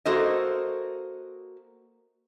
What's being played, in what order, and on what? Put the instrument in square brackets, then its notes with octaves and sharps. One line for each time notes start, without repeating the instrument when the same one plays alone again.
[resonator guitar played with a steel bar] A#3 F#4 A4 C5 D#5